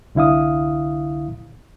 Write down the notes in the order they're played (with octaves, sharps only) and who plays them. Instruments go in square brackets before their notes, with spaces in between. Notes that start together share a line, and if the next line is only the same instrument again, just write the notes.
[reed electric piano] C2 D3 E4 F5 D#6